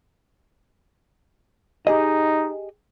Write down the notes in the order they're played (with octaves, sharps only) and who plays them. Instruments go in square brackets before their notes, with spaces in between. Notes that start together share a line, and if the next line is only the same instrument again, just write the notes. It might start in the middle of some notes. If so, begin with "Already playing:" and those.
[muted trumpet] D#4 [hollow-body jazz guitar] G4 G#4 D#5